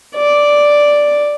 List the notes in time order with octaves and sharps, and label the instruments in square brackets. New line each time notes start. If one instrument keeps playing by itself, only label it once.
[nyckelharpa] D5